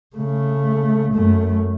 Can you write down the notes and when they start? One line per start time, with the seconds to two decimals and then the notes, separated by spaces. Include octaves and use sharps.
0.16 C#3 A3
1.14 F#2 A3